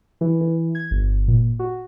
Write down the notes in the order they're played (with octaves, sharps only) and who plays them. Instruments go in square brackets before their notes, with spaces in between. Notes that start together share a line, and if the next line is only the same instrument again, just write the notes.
[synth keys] E3
E3
G#6
G1
A#2
F#4